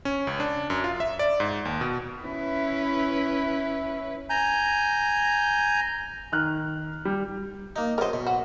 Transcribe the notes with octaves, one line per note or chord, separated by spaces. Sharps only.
C#4
C#2
D4
F#2
F4
E5
D5
G#2
D#2
B2
C#4 E4 B4
G#5 A#5 G6
D#3 F6 F#6
G3
A#3 D#4
F#2 A#4 C5 D#5
B2
F#4